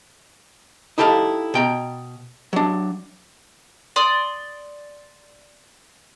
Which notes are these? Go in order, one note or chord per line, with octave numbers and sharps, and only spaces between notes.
D#4 E4 G4 A4 E5 F5
B2 G5 A#5
F#3 D4
D5 C6 D#6